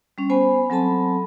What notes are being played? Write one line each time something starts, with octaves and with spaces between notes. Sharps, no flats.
G3 C#4
B3 C5 G#5 B5
F#3 C4 A4 A5 B5